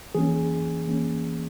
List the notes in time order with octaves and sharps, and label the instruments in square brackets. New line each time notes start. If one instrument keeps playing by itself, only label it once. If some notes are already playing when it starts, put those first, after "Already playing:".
[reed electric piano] E3 A#3 C#4 G#4
E3 A#3 C#4